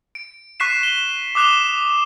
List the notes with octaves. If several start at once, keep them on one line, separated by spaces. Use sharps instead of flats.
D7
C#6 F#6 B6 C7 E7
E7 G7
D6 D#6 F#6 E7 G7